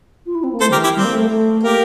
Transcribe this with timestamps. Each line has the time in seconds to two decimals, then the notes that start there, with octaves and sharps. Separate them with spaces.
0.25 F4
0.34 E4
0.43 C4
0.52 A#3
0.60 A3 A4 C5
0.70 D3 G4 A#4
0.77 E3
0.83 E4 G4
0.95 G3 C4
1.04 A#3
1.12 A3
1.29 A3
1.64 A#3 G4 A#4